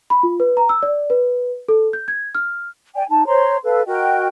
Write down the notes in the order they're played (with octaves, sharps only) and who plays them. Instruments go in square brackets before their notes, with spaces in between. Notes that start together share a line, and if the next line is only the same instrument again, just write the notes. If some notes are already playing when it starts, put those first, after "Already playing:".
[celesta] B5
F4
B4
A#5
E6
D5
B4
A4
G6
G#6
F6
[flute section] D5 G5 G#5
D#4 A5
C5 C#5 A#5 C6
A4 B4 F5
F#4 A#4 D#5 G5